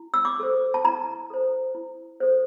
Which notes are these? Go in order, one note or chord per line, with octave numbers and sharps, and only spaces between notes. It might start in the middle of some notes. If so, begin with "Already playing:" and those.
Already playing: E4
E6
D6
A4 C5
A5
E4 A#5
A4 C5
E4
A4 C5